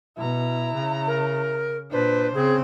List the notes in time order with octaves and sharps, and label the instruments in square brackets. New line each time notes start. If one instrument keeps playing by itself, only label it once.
[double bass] B2 [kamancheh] E4 A#5
[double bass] C#3
[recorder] A#4
[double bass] A#2 D4 [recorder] B4 [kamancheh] C5
[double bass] C#3 C4 [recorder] G#4